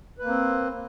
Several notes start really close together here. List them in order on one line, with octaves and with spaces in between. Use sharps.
B4 A#3 C4